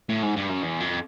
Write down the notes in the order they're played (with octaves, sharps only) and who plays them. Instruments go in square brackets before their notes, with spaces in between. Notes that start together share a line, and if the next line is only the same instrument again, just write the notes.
[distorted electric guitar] A2
G#2
G2
F#2
E2
F2